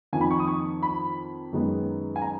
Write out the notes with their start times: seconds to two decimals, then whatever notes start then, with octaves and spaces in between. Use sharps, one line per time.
0.13 F2 D#3 A#3 G#5
0.21 B5
0.31 C#6
0.39 D#6
0.48 C#6
0.83 B5
1.52 F#2 D#3 G#3 B3
2.16 G#5
2.22 A#5